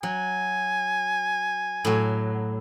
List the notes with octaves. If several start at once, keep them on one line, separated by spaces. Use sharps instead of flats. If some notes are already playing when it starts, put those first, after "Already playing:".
F#3 G#5
A2 F#3